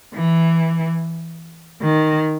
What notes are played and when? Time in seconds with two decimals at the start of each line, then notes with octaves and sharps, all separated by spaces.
0.15 E3
1.82 D#3